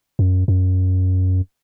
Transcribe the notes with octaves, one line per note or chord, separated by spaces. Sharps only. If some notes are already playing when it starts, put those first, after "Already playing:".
F#2
F#2